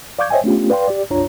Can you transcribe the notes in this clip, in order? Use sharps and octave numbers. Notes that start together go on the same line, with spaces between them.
D5 F5 C#6 D6 G6 G#6
C5 C#5 D#5 E5 G5 G#5
A3 B3 C#4 D4 F4 G4
B4 D5 F5 G5 C6
G4 D5
C2 F#2 D4 F4 C#5 A#5